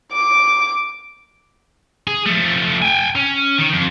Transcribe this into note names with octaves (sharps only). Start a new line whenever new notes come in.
D6
G#4
F3 A3
G5 G#5
C#4
D#3
F2